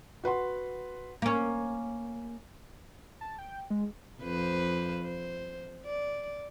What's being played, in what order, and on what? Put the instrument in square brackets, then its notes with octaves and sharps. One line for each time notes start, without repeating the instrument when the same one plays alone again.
[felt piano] F#4 B4 F#5 C6
[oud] A#3 C#4
[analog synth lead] A5
G5
G#3
[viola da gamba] F2 B4 C5
C5
D5